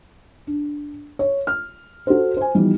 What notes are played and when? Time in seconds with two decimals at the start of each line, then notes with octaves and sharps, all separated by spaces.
0.47 D4
1.19 C#5
1.47 F6
2.07 F#4 A4 C5
2.37 C5 G#5
2.55 E3 F3 G3 B3 D#4